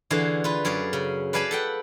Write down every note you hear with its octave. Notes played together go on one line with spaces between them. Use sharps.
D3 E3 F#4 G#4 F5
F4 B4
F#2 G#4 C#5 D5
C#3
B4 D5 F5 G#5 A5 B5
A4 F#5 G5